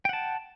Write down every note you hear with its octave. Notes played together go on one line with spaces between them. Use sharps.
F#5 G5 A5